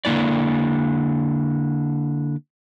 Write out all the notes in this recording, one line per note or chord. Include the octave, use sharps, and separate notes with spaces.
D3 A#3 E4 D5